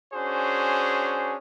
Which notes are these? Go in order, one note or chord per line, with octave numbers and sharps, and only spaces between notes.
C#4 D4 F#4 G#4 C5